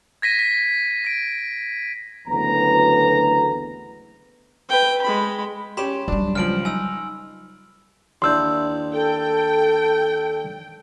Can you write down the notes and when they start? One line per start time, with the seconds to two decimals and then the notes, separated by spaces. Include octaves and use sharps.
0.22 G#6 A#6 B6 D#7
0.39 B6
1.05 A#6 D7
2.27 F#1 D2 E3 B3 A#5
4.69 B4 G5
5.02 G#3 B5
5.77 C#4 G4 B5 C6 E7
6.08 F#3 G3 D4
6.35 C#2 F3 F6 D7 F#7
6.65 D#4 G#5 E6
8.22 D#2 D4 E4 C6 E6 G6
8.93 A4 G5